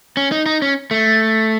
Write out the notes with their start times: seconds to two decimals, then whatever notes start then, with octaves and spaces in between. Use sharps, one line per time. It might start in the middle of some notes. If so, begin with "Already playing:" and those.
0.17 C#4
0.32 D#4
0.46 D#4
0.62 C#4
0.91 A3